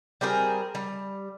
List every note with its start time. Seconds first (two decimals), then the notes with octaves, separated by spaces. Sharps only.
0.21 G3 C4 G#4 A#4
0.75 G3